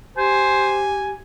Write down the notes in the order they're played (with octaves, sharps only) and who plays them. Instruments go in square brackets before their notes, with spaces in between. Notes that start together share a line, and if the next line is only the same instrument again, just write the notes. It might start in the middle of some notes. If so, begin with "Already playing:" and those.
[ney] G4 [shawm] C5 [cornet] G#5